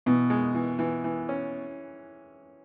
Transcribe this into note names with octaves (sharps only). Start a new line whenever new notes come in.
B2 E3
G#3
E3
E3
E3
C#4